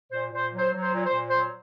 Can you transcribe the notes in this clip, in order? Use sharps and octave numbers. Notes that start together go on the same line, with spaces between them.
A#2 C5
A#2 C5
F#3
C5
F#3
C5
A#2
C5
A#2
F#3 C5